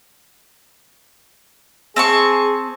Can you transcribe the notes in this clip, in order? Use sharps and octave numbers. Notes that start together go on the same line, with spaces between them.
C4 G#4 A5 C#6